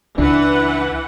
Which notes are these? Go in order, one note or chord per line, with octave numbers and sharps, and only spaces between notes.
C#2 C#3 E3 D4 B4 F#5